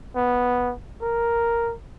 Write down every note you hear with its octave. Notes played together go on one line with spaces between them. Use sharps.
B3
A#4